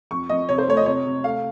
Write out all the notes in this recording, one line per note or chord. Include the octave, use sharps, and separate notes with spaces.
F2 C#6
F2 D#5
C3 C#5
C5
A3 C#5
D#5
C3 C#5
C3
A3 F5